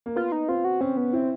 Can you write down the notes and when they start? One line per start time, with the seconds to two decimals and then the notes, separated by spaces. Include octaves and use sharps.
0.06 A#3
0.16 B3 F4
0.32 D#4
0.48 C4 F4
0.65 F#4
0.81 C4 C#4
0.97 B3
1.13 C4 E4